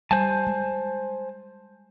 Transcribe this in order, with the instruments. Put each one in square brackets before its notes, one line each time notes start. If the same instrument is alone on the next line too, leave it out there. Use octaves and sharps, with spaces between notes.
[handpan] G3 [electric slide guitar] C5 G#5 A5
[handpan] G#3